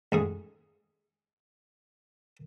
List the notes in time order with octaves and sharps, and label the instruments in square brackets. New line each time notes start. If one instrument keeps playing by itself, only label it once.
[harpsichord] A1 G#2 G#4